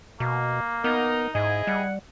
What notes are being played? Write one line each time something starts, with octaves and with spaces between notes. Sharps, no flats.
B2 A#3
B3 D#4 A#4
G#2 E4 G#4 D#5
G3 F#5